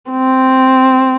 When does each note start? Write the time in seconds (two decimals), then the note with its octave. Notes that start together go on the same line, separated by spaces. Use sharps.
0.11 C4